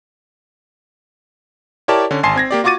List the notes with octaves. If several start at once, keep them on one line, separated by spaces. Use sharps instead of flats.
E4 G4 A#4 C#5 D5 A5
D3 C#4
G#1 G#5 A5 C6 C7
C4 G#6 A#6
A#3 G4 D5
F4 F#4 C#6 D6 A6 D#7